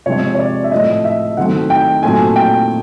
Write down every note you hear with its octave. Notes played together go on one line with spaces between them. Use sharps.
C3 F3 G#3 C4 C#5
C#5
D5
E5
A2 F3 A3 C4 D#5
E5
D#3 F#3 A3 C4 F#5
G5
A#2 F#3 A3 C4 G#5
G5